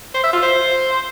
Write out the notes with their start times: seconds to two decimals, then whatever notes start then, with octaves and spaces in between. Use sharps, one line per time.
0.14 C5
0.24 E5
0.33 F4
0.42 C5